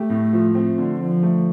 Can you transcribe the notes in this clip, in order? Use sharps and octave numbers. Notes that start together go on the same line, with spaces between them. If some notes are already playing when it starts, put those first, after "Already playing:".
Already playing: A3 G4
A2
F3
A3 C4
D3
D3 F3
A3